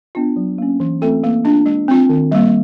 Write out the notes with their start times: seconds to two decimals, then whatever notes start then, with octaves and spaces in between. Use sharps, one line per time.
0.15 B3 D4 F4
0.36 F#3
0.58 A#3 C#4
0.80 E3
1.02 A3 C4 F4 A4
1.24 A#3
1.45 D4 F4
1.66 G#3
1.88 C4 F4
2.09 D#3
2.32 G3 A#3